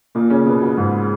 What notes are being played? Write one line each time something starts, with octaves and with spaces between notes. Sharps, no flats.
A#2 A#3
C#3 C#4
B2 B3
B2 B3
G#2 G#3